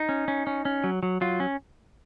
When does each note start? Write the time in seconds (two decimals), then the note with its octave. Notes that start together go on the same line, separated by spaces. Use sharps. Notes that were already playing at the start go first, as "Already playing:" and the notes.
Already playing: D#4
0.09 C#4
0.28 C#4
0.47 C#4
0.65 C#4
0.84 F#3
1.03 F#3
1.21 F#3 F4
1.40 C#4